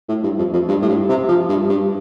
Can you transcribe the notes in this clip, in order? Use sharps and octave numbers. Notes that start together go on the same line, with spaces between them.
A2
G2
F2
F2
G2
A2
G2
C3
F3
G2
G2